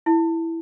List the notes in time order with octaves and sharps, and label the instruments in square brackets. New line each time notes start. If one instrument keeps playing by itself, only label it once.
[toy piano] E4